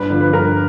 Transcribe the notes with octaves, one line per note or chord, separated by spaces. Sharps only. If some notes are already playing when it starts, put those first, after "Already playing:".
Already playing: G2 B4
D3 F3
B4
G2 A#4